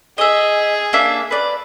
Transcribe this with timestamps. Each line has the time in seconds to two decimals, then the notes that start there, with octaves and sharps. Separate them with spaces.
0.18 G#4 D#5 E5
0.93 A#3 D4 E5
1.31 B4 D5